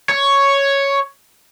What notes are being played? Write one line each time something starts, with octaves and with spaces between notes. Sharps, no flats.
C#5